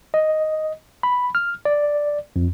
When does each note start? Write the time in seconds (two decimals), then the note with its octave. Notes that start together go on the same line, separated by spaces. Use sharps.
0.14 D#5
1.03 B5
1.35 F6
1.65 D5
2.36 F2